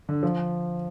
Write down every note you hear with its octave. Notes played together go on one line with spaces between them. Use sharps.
D3
F3